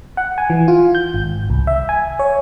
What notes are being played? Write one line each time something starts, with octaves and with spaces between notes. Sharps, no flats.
F#5
G#5
E3
F4
G6
G#1
C2
E5
G#5
C#5